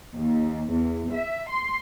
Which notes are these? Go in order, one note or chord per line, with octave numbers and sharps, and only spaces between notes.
D#2
E2
E5
C6